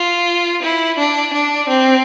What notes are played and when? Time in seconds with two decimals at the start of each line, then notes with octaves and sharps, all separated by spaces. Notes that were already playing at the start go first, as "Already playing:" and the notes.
Already playing: F4
0.62 E4
0.98 D4
1.33 D4
1.69 C4